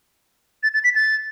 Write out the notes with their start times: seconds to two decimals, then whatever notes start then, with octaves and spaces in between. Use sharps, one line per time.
0.63 A6
0.74 A6
0.84 B6
0.96 A6